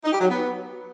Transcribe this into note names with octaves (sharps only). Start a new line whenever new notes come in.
D#4
G4
F#3
B3